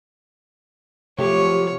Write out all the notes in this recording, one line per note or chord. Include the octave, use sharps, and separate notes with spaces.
C3 F3 F#3 A3 C4 G4 C#5